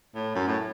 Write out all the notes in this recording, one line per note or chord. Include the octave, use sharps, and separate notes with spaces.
A2
F#2
A2